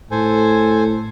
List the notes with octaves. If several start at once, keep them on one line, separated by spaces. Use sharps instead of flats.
A2 A4 C5 G#5